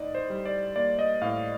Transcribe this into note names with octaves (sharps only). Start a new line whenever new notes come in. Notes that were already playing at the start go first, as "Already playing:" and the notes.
Already playing: A2 D#4 D5 D#5
C5
G3
D5
A#3 D5
D#5
A2 F5